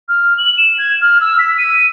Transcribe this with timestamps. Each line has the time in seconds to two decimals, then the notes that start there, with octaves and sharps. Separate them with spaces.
0.09 F6
0.38 F#7
0.58 E7
0.78 G#6
1.01 F6
1.21 E6
1.39 B6
1.58 D#7